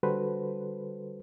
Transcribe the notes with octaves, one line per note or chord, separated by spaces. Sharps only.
D3 G3 F#4 A4 B4 C5